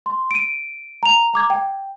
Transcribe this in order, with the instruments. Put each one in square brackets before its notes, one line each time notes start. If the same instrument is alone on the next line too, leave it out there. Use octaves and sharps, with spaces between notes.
[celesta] C6
D7 D#7
A#5 F7
A#5 D6 G#6
G5